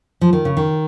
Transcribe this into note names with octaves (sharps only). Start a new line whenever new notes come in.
F3
D#3
C#3
D#3